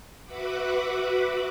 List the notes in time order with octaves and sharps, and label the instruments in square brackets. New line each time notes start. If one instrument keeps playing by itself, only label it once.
[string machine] F#4 B4 E5 F#5 B5 D6